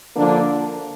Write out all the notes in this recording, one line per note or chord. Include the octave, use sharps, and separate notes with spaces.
D3 F3 A#3 D4